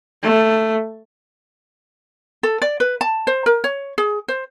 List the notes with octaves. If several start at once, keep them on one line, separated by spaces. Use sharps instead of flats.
A3
A4
D5
B4
A5
C5
A#4
C#5
G#4
C5